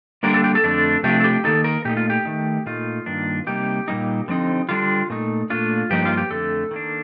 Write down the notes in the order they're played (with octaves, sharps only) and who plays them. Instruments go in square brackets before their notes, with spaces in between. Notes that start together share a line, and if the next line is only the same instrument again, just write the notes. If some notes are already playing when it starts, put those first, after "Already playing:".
[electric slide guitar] D3 G3 A#3 D4 A#4
A4
G4
A4
F2 D3 A3 D4
C3 F3 A3 D4 G4
A4
G4
D#3 A#3 D#4 A4
A#4
A#2 A3 D#4 G4
F4
G4
D#3 A3 D#4
A#2 A3 D#4 F4
G2 D#3 A#3 D4
C3 G3 A#3 D#4 G4
A#2 G3 A#3 D#4
D3 F3 C4 D#4
D3 G3 D4 F4
A#2 A3 D#4
A#2 A3 D4 F4
G2 F3 A#3 D#4 G4
F4
G4
F2 D3 A3 A4
D#3 A#3 D4